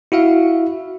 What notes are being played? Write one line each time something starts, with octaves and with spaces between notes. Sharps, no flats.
E4 F#4 E5 F5